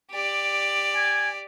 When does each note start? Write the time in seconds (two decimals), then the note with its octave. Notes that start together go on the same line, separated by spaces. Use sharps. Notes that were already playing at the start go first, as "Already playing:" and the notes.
0.11 G4 D5
0.96 G#5